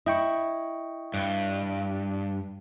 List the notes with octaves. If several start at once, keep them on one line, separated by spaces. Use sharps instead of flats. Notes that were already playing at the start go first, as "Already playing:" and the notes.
E4 D#5 G5 C#6
G2